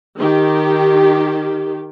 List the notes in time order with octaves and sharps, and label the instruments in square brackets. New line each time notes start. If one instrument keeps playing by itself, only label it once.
[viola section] D#3 G4